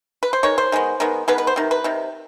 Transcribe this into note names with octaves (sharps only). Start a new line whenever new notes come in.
B4
C5
D#3 G#3 C#5
C5
D#3 G#3 B3
D#3 G#3 B3
D#3 G#3 B3 B4
B4
C5
C3 D#3
B4
C3 D#3